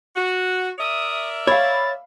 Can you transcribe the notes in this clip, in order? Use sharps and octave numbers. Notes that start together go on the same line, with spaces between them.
F#4
A#4 D5 E5 D#6
C#5 F5 B5 A6